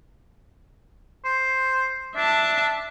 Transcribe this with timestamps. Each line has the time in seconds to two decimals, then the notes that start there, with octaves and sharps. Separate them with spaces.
1.25 C5
2.16 D4 E5 A5